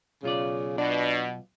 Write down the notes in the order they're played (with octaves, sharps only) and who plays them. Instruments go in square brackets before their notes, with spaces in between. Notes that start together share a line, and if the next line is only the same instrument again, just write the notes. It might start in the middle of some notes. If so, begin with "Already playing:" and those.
[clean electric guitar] B1 F4 D5 [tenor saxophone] C#3
[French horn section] B2 [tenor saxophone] D4